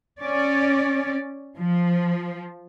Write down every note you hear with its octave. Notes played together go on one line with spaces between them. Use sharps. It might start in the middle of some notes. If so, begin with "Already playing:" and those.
C#4 D5
F3